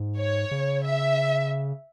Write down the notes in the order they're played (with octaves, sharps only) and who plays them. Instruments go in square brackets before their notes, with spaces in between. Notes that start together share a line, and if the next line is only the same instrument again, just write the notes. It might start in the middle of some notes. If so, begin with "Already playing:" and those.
Already playing: [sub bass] G#2
[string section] C#5
[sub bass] C#3
[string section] E5